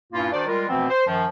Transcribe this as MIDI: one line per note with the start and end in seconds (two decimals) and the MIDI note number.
0.13 0.28 43
0.13 0.28 46
0.13 0.28 58
0.13 0.28 61
0.13 0.28 64
0.13 0.28 65
0.32 0.47 51
0.32 0.47 62
0.32 0.47 66
0.32 0.47 72
0.32 0.47 74
0.47 0.67 55
0.47 0.67 56
0.47 0.67 65
0.47 0.67 70
0.68 0.89 47
0.68 0.89 52
0.68 0.89 53
0.68 0.89 57
0.68 0.89 59
0.68 0.89 60
0.89 1.04 72
1.07 1.25 42
1.07 1.25 51
1.07 1.25 53